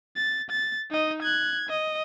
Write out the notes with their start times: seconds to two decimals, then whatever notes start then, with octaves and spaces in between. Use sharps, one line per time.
0.16 A6
0.50 A6
0.91 D#4 D#5
1.23 F#6 G#6
1.69 D#5